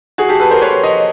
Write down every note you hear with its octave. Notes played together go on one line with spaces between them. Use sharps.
F#4 G#4
G4 A4
A4 B4
A#4 C5
B4 C#5
C#5 D#5